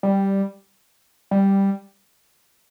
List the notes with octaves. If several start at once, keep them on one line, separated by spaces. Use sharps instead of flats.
G3
G3